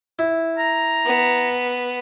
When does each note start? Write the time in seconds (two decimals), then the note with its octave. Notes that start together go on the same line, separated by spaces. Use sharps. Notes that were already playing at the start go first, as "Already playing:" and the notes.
0.19 E4
0.59 A#5
1.06 B3